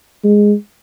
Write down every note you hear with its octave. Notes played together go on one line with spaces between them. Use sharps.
G#3